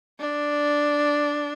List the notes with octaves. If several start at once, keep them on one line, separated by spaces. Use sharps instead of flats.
D4